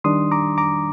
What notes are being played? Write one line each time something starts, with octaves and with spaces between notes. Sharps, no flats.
D#3 G3 D4 C6 D#6
A#5 D6
A#5 D6